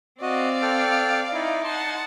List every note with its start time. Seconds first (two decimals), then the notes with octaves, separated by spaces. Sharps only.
0.22 C4 F#4 D5 D#5 F5
0.62 A4 G5 F6
1.33 D#4 E4
1.64 F#5 A5 C6